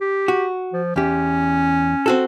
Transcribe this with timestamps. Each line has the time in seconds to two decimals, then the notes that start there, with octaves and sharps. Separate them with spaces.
0.01 G4
0.28 F#4
0.73 F3
0.96 E2 C#4 G4
2.06 C4 F#4 A4